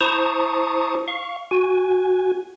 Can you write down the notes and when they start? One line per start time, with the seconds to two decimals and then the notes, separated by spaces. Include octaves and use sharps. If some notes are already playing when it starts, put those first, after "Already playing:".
0.01 E4 C5 A5 A#5 C#6 D#6
1.08 F5 C#6
1.51 F#4 G#5